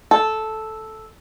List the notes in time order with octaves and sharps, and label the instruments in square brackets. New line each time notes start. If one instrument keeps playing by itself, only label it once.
[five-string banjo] A4